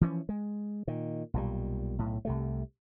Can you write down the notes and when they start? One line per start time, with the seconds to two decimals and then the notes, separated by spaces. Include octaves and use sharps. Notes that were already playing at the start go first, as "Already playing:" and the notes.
0.01 E3 F3 C#4
0.29 G#3
0.87 A#2 D#3
1.34 B1 A#2 G3
1.99 B1 A2
2.25 C2 C3 A3